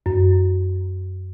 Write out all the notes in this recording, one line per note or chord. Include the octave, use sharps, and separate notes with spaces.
F#2